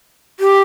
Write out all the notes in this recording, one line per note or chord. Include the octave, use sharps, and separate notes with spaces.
G4